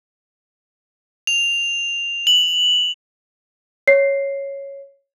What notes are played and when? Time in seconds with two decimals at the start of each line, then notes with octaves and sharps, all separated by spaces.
1.27 F7
2.27 F#7
3.87 C#5 C7